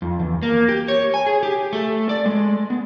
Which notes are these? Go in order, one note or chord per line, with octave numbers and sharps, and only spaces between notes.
F2
E2
A#3
G4
C#5
G#5
G#4
G4
A3
D5
G#3
B3